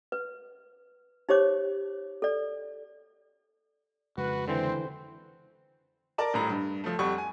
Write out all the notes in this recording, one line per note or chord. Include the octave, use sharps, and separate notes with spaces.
B4
D#4 G4 C5 C#5 D6
A4 D5
F2 C#3 G#3 F#4 B4
D3 E3 C4 C5
A#4 D5 A5
D#1 A2 A#5
G2
F3 A3
F2 G3 F#5 C#6
G#5